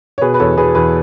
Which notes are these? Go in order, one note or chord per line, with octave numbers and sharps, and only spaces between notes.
C#5
B2 G#4 B4
B4
E2 A4 C#5
B2 G#4 B4
E2 G#4 B4